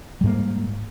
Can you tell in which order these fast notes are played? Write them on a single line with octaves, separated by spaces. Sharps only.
G3 G#2 A#3